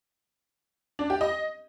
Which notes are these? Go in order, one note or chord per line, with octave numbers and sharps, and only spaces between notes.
D4
G4
D#5